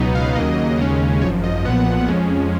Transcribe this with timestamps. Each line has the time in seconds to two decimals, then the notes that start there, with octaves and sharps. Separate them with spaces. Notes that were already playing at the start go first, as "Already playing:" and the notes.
Already playing: C#2 B2 F#3 B3 D#4
0.15 F5
0.35 D#2 C#3 F#3 A#3 D#5
0.79 D#2 C#3 G#3 C#4
1.21 G#1 F#2 F3 C#5
1.43 D#5
1.65 B1 A#2 F3 B3 F#5
2.08 F2 F3 G#3 C#4